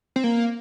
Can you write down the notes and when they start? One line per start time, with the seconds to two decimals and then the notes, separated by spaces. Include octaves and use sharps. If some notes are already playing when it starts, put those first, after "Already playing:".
0.16 C4
0.24 A#3